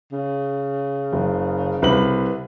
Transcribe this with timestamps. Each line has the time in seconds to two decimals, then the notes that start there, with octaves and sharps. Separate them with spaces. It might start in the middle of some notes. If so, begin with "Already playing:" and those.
0.12 C#3
1.12 F#1
1.82 C2 B4 F#7